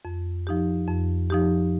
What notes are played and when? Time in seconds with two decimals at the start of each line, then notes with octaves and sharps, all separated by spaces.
0.05 F2
0.47 F3 D#4 G4
0.88 F2
1.30 F3 D#4 G4